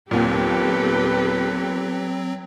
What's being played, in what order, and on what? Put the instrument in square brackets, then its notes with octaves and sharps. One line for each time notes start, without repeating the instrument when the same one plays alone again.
[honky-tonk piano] D#2 A#2 [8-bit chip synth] F#3 C4 [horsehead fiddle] B3 B4 [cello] G4 A4